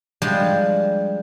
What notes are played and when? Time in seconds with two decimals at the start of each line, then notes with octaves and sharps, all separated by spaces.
0.22 F3 G3 G#3 D4